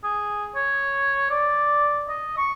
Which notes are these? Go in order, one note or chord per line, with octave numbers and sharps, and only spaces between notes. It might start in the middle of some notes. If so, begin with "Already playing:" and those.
G#4
C#5
D5
D#5
C#6